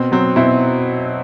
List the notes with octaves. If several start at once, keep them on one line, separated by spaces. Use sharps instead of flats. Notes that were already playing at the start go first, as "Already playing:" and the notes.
Already playing: B2 C4
F#3 C4
B2 C4 E4